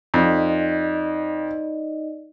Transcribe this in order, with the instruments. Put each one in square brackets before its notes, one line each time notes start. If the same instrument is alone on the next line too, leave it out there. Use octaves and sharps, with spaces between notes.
[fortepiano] F2 [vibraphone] D#4 D5 D#5